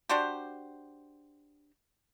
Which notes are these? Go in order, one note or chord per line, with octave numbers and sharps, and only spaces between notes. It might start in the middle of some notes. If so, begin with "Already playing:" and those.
D4 F#4 G4 C5